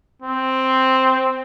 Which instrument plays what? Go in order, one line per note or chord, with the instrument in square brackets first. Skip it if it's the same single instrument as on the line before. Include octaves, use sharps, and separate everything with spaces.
[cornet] C4